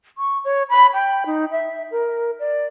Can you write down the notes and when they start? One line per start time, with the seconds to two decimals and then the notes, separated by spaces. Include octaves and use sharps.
0.18 C#6
0.45 C#5
0.69 B5
0.94 G5
1.26 D#4
1.51 E5
1.91 A#4
2.39 D5